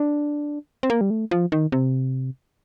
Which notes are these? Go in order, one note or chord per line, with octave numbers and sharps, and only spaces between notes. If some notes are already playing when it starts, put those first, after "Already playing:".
Already playing: D4
C4
A#3
G3
A3
F3
D#3
C3